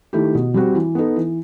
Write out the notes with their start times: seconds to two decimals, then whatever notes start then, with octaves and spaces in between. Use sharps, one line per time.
0.13 D#3 A3 E4 G4
0.35 B2
0.54 G3 C4 F#4
0.75 E3
0.95 B3 D#4 A4
1.16 E3